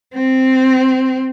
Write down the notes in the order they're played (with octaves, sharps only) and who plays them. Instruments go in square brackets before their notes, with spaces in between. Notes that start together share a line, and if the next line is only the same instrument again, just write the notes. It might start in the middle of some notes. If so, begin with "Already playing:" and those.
[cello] C4